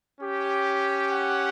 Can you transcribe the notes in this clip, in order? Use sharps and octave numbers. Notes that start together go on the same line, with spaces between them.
C#4 G4
F#5